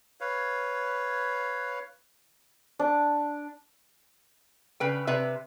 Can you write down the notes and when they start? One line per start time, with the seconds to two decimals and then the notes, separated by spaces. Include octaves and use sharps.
0.21 B4 C#5 F5
2.79 D4
4.80 C#3 B4 G5
5.07 C3 B4 E5